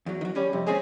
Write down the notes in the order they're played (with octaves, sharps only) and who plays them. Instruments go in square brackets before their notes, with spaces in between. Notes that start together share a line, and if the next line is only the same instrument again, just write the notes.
[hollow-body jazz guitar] E2 F#3
D#3 F#3
[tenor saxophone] G3 [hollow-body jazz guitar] C#4
[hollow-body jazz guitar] F2 [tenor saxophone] C3
[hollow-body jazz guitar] G#3 C4 C#4 [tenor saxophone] G#4